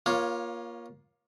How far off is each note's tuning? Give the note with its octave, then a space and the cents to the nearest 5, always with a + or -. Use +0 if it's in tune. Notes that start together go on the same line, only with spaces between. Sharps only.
A#3 +25 F4 +0 C#5 +0